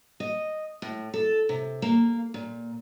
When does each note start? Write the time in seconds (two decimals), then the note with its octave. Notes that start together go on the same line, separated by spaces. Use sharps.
0.20 D#5
0.82 A2
1.14 A4
1.49 C3
1.82 A#3
2.34 A#2